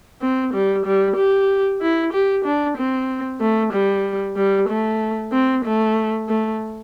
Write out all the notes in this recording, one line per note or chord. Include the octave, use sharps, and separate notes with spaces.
C4
G3
G3
G4
E4
G4
D4
C4
A3
G3
G3
A3
C4
A3
A3